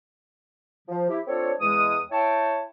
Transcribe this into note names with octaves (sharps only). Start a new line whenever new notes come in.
F3
E4 G4
C4 D4 F4 A4 C#5
E2 G#3 D#6
E4 C#5 G5 A5